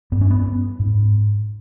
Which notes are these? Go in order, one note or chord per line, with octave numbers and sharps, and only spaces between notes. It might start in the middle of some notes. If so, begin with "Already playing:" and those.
G2 B3
C#4
B3
G#2